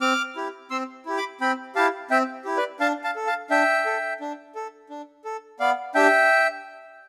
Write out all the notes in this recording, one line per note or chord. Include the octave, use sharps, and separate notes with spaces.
C4 D6 F6
E4 G4
C4 C6 E6
E4 G4
B5 D6
C4 G5 B5
E4 G4 F5 A5
C4 E5 G5
E4 G4
B4 D5
D4 F5 A5
F5 A5
A4
F5 A5
D4 E5 G5
A4
D4
A4
D4
A4
B3 D5 F5
D4 G4 E5 G5